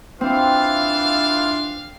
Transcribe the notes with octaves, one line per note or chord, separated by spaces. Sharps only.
E3 C4 D4 F4 F5